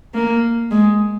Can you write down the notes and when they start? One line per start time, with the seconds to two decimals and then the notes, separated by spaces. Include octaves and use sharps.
0.14 A#3
0.71 G#3